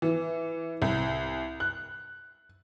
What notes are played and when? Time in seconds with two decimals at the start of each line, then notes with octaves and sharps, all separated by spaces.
0.02 E3
0.82 C2
1.60 F#6